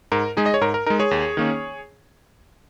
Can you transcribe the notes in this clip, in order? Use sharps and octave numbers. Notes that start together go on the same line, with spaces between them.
G#2 A#4
G#3 D#4 G#4
D#5
C#5
G#2 A#4
A#4
G#3 D#4 A#4
G#4 C#5
D#2
D#3 A#3 C#4